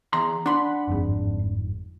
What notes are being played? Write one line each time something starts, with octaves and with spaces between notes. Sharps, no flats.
E2 A#5 C6
D4 F#5 B5 C6
G1 F2 G#2